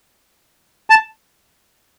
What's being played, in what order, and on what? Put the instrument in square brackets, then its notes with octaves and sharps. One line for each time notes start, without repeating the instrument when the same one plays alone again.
[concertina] A5